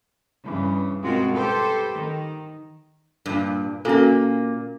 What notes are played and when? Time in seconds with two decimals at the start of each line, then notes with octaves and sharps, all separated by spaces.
0.44 G2 C#3 E3
1.03 B2 G#3 C4 F4 F#4 A#4
1.35 G4 A4 B4 C5
1.93 D#3
3.26 G2 A#2
3.85 A#2 A#3 C#4 F#4 A4